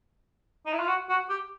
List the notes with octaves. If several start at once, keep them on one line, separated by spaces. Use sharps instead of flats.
D#4
E4
F4
F#4
F#4
G4